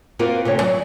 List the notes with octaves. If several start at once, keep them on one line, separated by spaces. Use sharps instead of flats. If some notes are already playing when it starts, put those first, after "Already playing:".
A#3 C4 F4 F#4 A#4 B4
D2 C3 C#4 C#5
F#3 D5